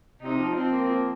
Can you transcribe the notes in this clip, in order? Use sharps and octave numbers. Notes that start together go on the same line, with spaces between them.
C3 D#4
F3
F3 C4
A#3
F3